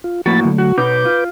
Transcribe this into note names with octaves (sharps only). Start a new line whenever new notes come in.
F4
A2 F3 A#3 F#4 B5 A6
D3 F#3 A3
F#4
B2 D#4 B4 D6 G6
F4